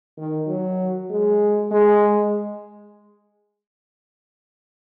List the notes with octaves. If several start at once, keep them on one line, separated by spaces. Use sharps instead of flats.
D#3
F#3
G#3
G#3